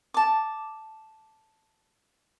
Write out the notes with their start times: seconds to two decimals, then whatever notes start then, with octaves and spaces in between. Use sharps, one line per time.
0.14 A5 D6